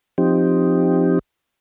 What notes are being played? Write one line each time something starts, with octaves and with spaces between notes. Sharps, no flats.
F3 C4 D#4 G4